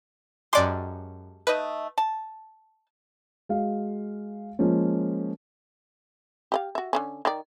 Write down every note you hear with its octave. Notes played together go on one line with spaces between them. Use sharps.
F#2 G#3 G4 A4 D5 C6
A3 D#4 B4 D#5
A5
G#3 F#4 F5
F3 G#3 A#3 C#4
G4 D#5 F5
F#4 E5
D3 D#3 C#4
D#3 D5